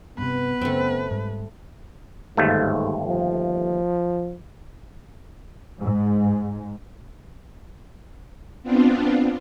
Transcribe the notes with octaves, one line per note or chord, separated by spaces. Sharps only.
G2 C3 B3 B4
F#2 C#3 A3 C4
G#2 G3
G1 D#2 G#2 A3
F3
G#2
B3 C4 D4 F4